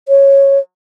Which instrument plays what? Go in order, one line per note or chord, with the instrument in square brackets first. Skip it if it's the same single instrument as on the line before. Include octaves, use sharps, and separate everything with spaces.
[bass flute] C#5